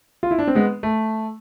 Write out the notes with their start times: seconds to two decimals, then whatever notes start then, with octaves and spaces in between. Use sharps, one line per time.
0.23 F4
0.31 E4
0.39 D4
0.47 C4
0.55 G#3 B3
0.83 A3